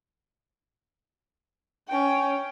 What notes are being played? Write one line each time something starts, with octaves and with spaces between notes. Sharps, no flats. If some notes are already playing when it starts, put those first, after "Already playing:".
C#4 G5